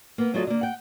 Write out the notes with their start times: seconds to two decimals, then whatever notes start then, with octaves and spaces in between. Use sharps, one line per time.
0.18 A#3 B3
0.34 D2 F#3 G#3 F4 A4 D#5
0.47 D3 A#3
0.61 F#5 G5